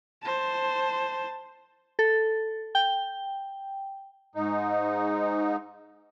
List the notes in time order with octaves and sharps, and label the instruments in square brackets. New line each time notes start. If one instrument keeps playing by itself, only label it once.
[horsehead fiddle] C5 A5
[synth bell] A4
G5
[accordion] G#2 D#4